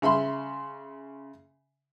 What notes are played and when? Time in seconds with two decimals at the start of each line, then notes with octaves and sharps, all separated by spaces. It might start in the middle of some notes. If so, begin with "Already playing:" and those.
0.02 C#3 E5 B5 C6